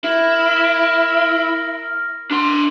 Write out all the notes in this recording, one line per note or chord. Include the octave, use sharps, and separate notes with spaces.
E4 A#4
D4 C6